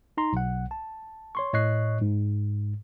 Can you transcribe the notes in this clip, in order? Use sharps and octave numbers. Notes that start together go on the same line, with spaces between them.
D#4 A#5 C6
B1 F#5
A5
C#5 C6 C#6
A2 C#5 D#5 C#6 F#6 C7
G#2